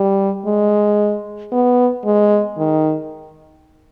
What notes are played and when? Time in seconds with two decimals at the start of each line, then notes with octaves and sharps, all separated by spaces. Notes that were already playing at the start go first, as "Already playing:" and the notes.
Already playing: G3
0.46 G#3
1.52 B3
2.05 G#3
2.57 D#3